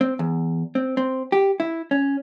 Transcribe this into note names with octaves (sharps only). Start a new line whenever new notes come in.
C4
E2
C4
C4
G4
E4
C#4